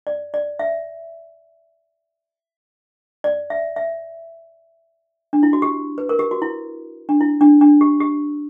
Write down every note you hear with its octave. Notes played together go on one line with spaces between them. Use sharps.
D5
D5
E5
D5
E5
E5
D4
E4
F#4
G4
B4
A#4
G4
F#4
E4
D4
E4
D4
D4
G4
G4